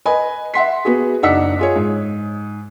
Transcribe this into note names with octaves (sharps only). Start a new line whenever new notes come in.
B4 D#5 G#5 B5
E5 F#5 C6 B6
B3 F#4 G#4
F#1 D4 D#4 F#5 E6 B6
F4 G#4 C#5
G#2